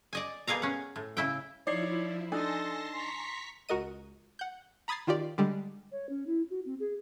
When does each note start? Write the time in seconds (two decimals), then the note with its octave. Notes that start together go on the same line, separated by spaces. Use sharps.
0.13 D5 D#5 G#5
0.47 B2 G3 G#4 A#4 F5 A#5
0.62 C#4 F#5
0.96 A2
1.17 C#3 E4 G5
1.67 F3 D#4 E4 C#5 D5 C7
2.32 D4 D#4 A4 G#5 A5 C6 A#6
2.92 A#5 C6 C#6 B6
3.69 C#2 F#4 A#4 D#5 D#7
4.39 F#5 G6
4.88 A#5 B5 D#6 G#6 A6 C7
5.07 D#3 F4 G4 D5
5.38 D3 G3 G#3
5.92 C#5
6.09 C#4
6.27 E4
6.50 F#4
6.65 C4
6.80 G#4